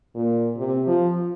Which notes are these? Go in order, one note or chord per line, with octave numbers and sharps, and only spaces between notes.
A#2
C3
F3